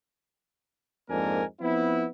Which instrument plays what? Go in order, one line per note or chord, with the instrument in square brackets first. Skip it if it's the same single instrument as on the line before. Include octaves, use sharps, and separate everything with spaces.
[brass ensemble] F2 G#2 A#3 D4 A#4 G#5
F3 B3 C4 E4